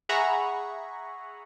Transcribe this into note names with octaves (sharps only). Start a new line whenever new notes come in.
G#4 E5 F#5 A#5 B5 C#6